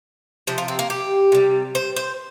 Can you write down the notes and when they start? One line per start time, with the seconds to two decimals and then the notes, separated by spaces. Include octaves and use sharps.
0.47 C3 F3 C5
0.58 F4
0.68 C4
0.79 A#3
0.90 G4
1.32 C3 G3
1.75 C5
1.96 C5